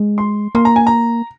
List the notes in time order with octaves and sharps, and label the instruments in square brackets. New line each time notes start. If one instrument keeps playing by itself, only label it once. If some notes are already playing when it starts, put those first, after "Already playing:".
Already playing: [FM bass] G#3
[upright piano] C6
[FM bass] A#3 [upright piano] C6
[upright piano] A#5
G#5
A#5